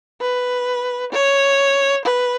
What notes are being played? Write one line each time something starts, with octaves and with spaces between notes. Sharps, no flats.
B4
C#5
B4